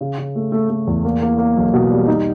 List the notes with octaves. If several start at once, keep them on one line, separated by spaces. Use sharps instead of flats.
C#3
C#3
A3
A3
A3
E2
A#3
A#3
A#3
B1
B2
G3
D#4